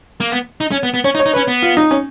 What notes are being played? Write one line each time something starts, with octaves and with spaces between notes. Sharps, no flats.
A#3
B3
D#4
C#4
B3
B3
C#4 C#5
D#4
C#5
D#4
C#4 B4
B3
F4
D#4
C#4